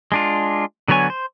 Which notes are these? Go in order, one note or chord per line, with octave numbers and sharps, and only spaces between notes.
G#3 D4 F4
D3 F#3 B3 C#5 G#5
C5